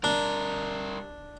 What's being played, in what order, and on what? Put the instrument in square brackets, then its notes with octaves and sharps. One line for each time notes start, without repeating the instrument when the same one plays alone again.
[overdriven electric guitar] G3 A#4 [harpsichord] D4